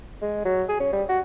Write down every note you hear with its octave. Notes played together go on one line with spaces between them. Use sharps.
G#3
F#3
G#4
C#4
G3
F#4